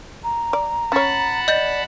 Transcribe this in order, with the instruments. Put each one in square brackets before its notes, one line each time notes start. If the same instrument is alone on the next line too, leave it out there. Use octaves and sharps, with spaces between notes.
[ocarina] A#5
[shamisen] D5
[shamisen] C#4 C#5 [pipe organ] F#5 A5 B5
[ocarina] D5 [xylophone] D#5 G6